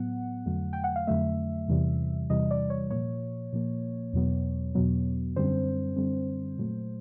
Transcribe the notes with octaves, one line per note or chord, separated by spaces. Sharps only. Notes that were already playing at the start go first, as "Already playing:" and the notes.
Already playing: A2 F#3 B3 F#5
F2 D3 F#3 A3
G5
F#5
F5
F2 D3 F#3 A3 E5
E2 C3 E3 G3
E2 C3 E3 G3 D#5
D5
C#5
A#2 F3 A#3 C#5
A#2 F3 A#3
E2 B2 F#3 B3
E2 B2 F#3 B3
F#2 D3 G3 C4 C5
F#2 D3 G3 C4
A#2 F#3 A3